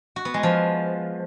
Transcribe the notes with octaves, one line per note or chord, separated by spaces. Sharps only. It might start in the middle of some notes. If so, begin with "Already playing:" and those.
F#4
B3
G#3
F3